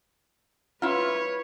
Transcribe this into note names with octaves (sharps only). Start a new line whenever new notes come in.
E4 F4 B4 C#5